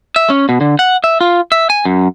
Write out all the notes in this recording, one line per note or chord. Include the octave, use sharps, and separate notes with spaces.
E5
C#4
B2
D3
F#5
E5
F4
E5
G#5
F#2